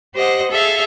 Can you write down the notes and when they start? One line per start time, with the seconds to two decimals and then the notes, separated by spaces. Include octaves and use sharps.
0.13 G4 C5 D#5 F#5
0.50 G#4 A4 E5 F5